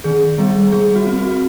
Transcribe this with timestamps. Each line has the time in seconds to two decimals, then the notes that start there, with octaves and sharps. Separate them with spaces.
0.04 D#3 G#4
0.38 G3 B3
0.72 G3 G#4
0.95 F#4
1.06 C4
1.19 F#4